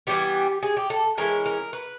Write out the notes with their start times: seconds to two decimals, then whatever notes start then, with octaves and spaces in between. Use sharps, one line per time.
0.07 E3 G3 B3 G4
0.63 G#4
0.77 G4
0.90 A4
1.18 E3 G#3 C#4 E4 A#4
1.46 A#4
1.73 B4